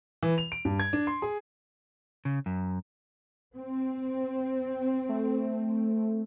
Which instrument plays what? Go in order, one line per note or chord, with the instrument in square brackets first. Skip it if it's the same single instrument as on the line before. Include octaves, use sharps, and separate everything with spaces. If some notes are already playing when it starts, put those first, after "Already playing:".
[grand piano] E3
F7
D7
G2
G#6
D4
C6
G#4
[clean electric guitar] C#3
F#2
[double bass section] C4
[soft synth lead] A3